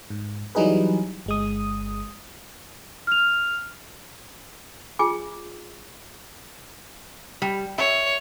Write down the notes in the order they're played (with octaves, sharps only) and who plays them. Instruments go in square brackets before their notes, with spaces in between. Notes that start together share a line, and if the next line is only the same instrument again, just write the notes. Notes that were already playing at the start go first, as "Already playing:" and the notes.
[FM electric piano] G#2
E3 F#3 G3 D#4 G#4 B4
G1 G#3 D#6
[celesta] F6 F7
[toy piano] F4 G#4 G#5 D6
[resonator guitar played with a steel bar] G3
[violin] C#5 [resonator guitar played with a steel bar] E5